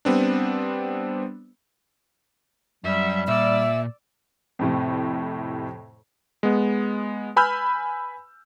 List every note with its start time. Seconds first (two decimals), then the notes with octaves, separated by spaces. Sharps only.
0.05 G3 B3 C4 D4
2.84 F#2 G3 E5
3.28 A#2 D5 E5 E6
4.59 F2 A2 C3
6.43 G#3 B3
7.36 B4 G#5 B5 E6 F6 G6